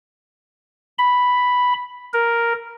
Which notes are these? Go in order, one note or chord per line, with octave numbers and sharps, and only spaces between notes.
B5
A#4